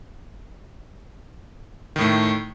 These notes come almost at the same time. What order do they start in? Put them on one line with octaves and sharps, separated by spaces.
D#3 A2 A3